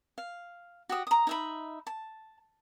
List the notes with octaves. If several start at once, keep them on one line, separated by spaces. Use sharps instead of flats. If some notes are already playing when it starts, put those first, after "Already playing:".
F5
F#4 G4 D#6
A#5 D#6
D#4 E5 B5
A5